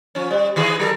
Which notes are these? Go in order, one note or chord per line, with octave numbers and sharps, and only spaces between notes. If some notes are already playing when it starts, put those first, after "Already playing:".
F3 C#4
G3
D#3 E3 G#4
F#3 A4 A#4